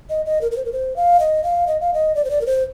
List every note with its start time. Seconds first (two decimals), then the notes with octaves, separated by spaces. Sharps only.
0.10 D#5
0.26 D#5
0.41 A#4
0.52 A#4
0.57 C5
0.65 A#4
0.73 C5
0.96 F5
1.20 D#5
1.44 F5
1.67 D#5
1.81 F5
1.94 D#5
2.15 D5
2.25 C5
2.31 D5
2.41 A#4
2.46 C5